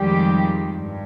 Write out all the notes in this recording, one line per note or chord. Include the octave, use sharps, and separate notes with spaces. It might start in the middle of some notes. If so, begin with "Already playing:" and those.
Already playing: F2 D#3 G3 G#3 G4
G2